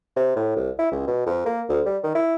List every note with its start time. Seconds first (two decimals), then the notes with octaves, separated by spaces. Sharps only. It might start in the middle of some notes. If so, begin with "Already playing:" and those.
0.16 C3
0.36 A2
0.56 C2
0.79 E4
0.92 C#2
1.07 B2
1.26 F2
1.46 A#3
1.69 D2
1.85 G3
2.03 D#3
2.15 E4